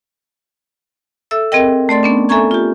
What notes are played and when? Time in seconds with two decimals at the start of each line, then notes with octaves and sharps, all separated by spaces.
1.31 A4 E5 E6
1.52 C4 G#4 A#4 D#5 G5
1.89 A3 D5 C6 A6
2.03 B3 C#4 D4
2.29 A4 E5 G#5 A#5 C#6 G#6
2.51 F4 G4